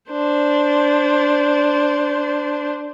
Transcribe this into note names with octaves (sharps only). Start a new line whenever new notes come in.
D4 C5